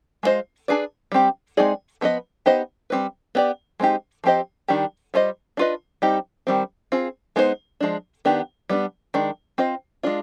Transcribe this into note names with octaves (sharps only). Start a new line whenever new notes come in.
G#3 B3 F4 C5 D#5
D4 G#4 B4 D5
G3 C4 G4
G#3 C4 D#4 G#4 D5
F3 B3 D#4 B4 D#5
B3 D#4 G4 C5 D#5
G3 C4 D#4 B4
B3 D4 G4 D5
G#3 C4 D#4 G4
F3 C4 G4 C5 D#5
D#3 G3 D4 G4
G3 D4 F4 C5 D#5
D4 F4 B4 D#5
G3 C4 D#4 G4
D#3 G3 C4
C4 F4 G#4
G#3 B3 D#4 G#4 C5
F3 G#3 D4
D#3 B3 D4 G4
G3 B3 D4
D#3 G#3 D4
C4 F4 C5 D#5
G#3 D4 F4